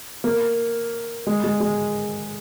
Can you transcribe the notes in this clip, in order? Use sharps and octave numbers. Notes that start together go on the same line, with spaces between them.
A#3
G#3
G#3
G#3